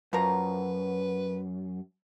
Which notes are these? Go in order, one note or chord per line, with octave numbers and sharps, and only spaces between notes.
F#2 F3 A#4 B4 A#5